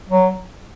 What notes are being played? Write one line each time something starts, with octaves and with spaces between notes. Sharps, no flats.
F#3